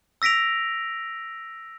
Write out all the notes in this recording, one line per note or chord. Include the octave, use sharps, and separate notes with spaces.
E6 A#6 B6 D7 F7